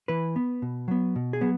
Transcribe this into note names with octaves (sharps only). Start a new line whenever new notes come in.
E3 B4
B3
B2
F#3 B3
B2
G#4
F#3 B3